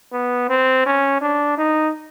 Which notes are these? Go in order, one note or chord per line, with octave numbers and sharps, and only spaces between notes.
B3
C4
C#4
D4
D#4